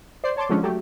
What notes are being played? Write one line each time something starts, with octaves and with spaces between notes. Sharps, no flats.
C5 D5 C7
C#5 A5 C6 D6
D3 F3 G#3 A3 C#4 D4
F#3 A3 G4